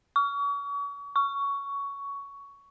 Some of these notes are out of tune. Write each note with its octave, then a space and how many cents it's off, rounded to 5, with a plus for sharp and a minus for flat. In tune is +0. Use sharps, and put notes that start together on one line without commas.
C#6 +40
C#6 +15